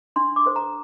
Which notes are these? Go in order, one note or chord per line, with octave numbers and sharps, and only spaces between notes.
D4 C6
D6
A4 C5
A#5